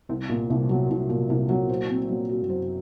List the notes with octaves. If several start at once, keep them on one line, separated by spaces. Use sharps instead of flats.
C2 C3
A#2
C2
F#3
C2
A#2
C2 C3
F#3
A#2 C5
C4
F#3
F#4
G2
F#2 C5